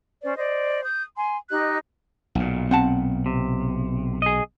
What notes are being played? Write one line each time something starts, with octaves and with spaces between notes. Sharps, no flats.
C#4 C5 D5
C5 D5 D#5
D#6 G6
G#5 C6
D#4 G4 D#5 F#6
B1 A#2
C4 F#5 A5
C3
G#4 D#5